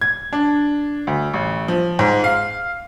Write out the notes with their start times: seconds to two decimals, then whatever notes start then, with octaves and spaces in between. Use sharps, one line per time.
0.01 G#6
0.33 D4
1.07 D2
1.34 A1
1.68 F3
1.99 G#2
2.24 F5